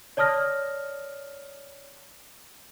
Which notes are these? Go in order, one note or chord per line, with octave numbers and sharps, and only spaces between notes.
C#5 D5 A5 D#6 F6 A#6